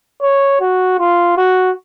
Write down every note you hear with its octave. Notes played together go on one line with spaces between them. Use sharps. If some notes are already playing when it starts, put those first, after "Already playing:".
C#5
F#4
F4
F#4